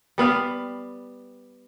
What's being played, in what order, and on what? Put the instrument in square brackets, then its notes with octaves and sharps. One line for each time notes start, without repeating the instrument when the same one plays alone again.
[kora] G3 B3 F5